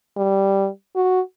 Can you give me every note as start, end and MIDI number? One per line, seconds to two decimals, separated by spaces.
0.17 0.67 55
0.95 1.20 66